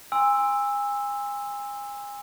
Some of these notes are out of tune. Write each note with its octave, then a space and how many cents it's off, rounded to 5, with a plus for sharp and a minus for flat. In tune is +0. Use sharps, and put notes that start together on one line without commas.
G#5 -30 C6 -5 E6 +0